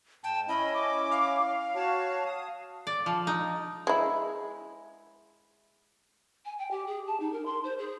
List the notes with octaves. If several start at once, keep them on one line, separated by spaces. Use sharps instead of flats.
G#2 G5 A5
C#4 E4 D#5 B5
D6
F5
F#4 C#5 A5
D#6
D5
F3
D#4
G#3 E4
G#5
G5
G4
G#4
A5
D#4
A#4
C6
C5
G#4